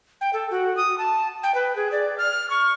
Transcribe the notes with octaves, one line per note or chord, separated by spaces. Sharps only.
G5
A4
F#4
D#6
A5
G5
B4
G#4
D5
F6
C#6